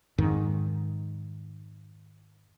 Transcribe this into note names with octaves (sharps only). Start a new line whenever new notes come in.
F2 G#2 D#3